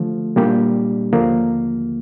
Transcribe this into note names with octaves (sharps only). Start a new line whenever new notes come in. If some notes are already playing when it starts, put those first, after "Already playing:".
Already playing: D3 F3 A3
A#2 G3 A#3 D4 G4
D#2 D3 F3 A#3